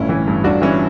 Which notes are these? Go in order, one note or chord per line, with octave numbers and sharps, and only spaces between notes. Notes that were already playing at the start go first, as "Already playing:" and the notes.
Already playing: G1 A2 C#4 E4
E3
G2
G1 D4 F#4
E3 C#4 E4